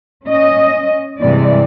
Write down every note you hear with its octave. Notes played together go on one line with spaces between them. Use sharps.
C#4 D#5
G2 C3 E3 G#3 D5